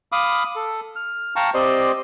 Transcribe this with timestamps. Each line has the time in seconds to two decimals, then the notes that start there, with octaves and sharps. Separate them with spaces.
0.12 F5 B5 D6 D#6
0.56 A4
0.96 F6
1.36 F5 G5 A5 A#5 C#6
1.54 C4 G4 C5 D5 D#5 C6